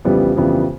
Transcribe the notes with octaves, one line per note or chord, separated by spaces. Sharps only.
F2 C#3 E3 G3 B3
F2 C#3 E3 G3 B3